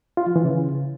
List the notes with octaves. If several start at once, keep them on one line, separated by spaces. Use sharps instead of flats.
F4
F3
E3
C#3